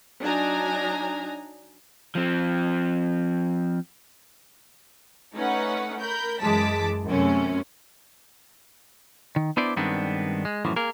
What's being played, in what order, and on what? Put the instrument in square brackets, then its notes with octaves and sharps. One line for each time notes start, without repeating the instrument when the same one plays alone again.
[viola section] F#3 D4 D#4 G#5 A#5
[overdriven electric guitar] F3 C4
[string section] A3 C#4 D#4 B4 F#5
A#4 B5 G6
F#2 E3 G#3 A5 D6 B6
F#2 C3 A3 C#4
[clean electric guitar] D#3
B3 D4 E4 C5 D5
G2 D#3 G#3 B3 C4 D4
G#3
F#2 A2 E3 F3
A#3 G#4 A#4